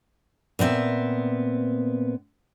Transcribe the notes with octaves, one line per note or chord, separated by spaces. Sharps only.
A#2 B3 C4 E5